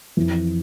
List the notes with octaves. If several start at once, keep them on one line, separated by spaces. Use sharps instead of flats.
F2 E3